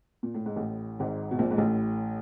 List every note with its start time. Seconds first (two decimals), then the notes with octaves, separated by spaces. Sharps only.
0.23 A#2
0.34 A2
0.46 G#2
0.56 A1 A2
1.00 G#1 G#2
1.31 B2
1.39 A#1 A#2
1.51 G#2
1.58 A1 A2